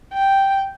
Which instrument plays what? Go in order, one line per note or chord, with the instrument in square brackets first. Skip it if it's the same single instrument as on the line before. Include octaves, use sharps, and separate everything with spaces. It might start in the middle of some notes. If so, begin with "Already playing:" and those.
[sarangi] G5